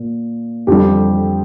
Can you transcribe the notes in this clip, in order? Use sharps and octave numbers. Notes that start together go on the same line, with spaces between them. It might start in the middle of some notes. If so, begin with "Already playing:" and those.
Already playing: A#2
F2 D3 G3 G4